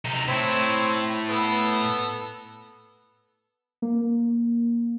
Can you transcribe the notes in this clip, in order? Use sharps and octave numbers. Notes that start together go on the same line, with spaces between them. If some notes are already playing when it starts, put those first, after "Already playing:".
C3 D#4
A2 C4 E4 C#5
B3 A4
A#3